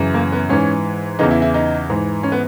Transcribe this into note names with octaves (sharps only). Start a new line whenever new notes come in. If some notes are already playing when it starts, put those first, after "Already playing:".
Already playing: F#2 C#3 E3
A#3
B3
G#2 E3 C#4
E2 C#3 E3 D#4
E4
E4
D#4
G#2 E3
C#4
B3